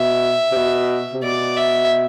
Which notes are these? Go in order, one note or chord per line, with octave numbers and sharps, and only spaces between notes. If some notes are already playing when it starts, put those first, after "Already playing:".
Already playing: B2 E5
C3
B2
C3
B2 D5
E5